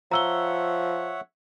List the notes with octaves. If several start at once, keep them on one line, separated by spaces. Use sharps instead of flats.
F3 C#5 E5 F#5 A#5 E6 G7